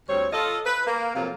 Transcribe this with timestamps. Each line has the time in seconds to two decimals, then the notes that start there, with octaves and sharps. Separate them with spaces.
0.09 D2 G3 C4 C#5
0.32 F4 A4 D#5
0.66 B4
0.87 A#3
1.15 C3 F3 F#3 A#3 F4 A4